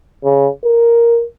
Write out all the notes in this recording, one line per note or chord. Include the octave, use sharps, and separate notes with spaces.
C#3
A#4